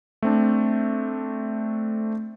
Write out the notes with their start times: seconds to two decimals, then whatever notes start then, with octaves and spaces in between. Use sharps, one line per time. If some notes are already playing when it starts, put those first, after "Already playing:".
0.23 A3 C4 D4